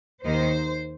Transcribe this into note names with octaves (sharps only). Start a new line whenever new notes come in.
D#2 D#3 A#3 D#4 C5